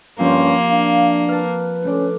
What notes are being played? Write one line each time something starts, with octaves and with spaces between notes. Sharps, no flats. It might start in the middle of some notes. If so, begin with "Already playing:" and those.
G2 F3 A#3 C4 C#4 G4
D4 F5
B4 F5 A5
A3 C#4 D4